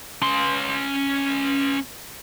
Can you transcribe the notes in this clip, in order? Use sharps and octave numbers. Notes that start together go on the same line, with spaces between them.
C#4 C6